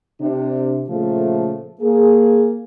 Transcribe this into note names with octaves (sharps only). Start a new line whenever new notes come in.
C3 D4
A#2 C#3 F3 A3
A#3 G#4